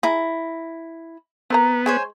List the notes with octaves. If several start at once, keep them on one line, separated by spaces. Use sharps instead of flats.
E4 G#4 A#5
B3 C4 A#4 A#5
G#3 C5 C#5 G#5